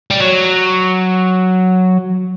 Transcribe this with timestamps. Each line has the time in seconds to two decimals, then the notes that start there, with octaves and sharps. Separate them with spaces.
0.11 G3
0.20 F#3